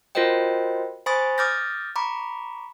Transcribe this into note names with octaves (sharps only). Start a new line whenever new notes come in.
F4 F#4 A#4 C5 D#5 G5
C5 G#5 B5 C#6 D#6 A6
D6 D#6 F6 G6 A6 A#6
A#5 B5 C#6 D6